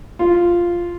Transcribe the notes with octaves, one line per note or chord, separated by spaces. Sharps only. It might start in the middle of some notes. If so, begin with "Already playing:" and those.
F4